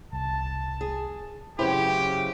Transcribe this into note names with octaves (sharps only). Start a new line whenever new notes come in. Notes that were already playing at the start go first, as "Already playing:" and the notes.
C2 A5
G#4
F#2 C#3 E4 G4 B4 C5